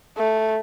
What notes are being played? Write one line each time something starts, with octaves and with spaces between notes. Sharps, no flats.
A3